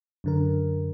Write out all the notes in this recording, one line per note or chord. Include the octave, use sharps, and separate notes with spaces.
F#2 D3 A#4